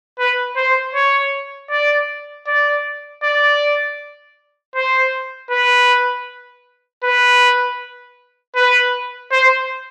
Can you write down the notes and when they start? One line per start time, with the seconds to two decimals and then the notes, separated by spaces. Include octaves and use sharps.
0.19 B4
0.56 C5
0.95 C#5
1.71 D5
2.47 D5
3.23 D5
4.75 C5
5.51 B4
7.04 B4
8.56 B4
9.31 C5